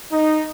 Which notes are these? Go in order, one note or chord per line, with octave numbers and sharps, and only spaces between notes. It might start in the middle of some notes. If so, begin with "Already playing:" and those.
D#4